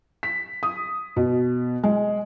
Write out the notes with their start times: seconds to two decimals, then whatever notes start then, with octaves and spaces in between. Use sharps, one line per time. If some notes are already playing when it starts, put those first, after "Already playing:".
0.23 B6
0.63 D#6
1.16 B2
1.83 G#3